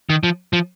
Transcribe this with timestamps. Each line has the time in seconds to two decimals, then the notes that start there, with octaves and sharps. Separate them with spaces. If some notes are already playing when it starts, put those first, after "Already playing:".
0.10 D#3
0.23 F3
0.53 F3